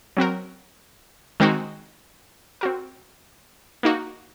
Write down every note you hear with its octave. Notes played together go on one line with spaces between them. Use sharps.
F#3 C4 F#4 A#4
D#3 G#3 C4 D#4 F#4
C4 F#4 A#4
A#3 D#4 F#4